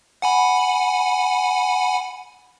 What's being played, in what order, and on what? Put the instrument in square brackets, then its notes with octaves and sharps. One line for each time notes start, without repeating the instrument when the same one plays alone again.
[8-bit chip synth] F#5 G#5 B5